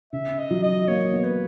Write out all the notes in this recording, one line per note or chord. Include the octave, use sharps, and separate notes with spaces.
C#3 E5
D#5
F#3
D#5
A#3 C#5
B3
B4